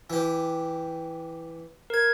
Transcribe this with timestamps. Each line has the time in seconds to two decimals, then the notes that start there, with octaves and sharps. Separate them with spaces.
0.10 E3 G4
1.90 A#4 G#6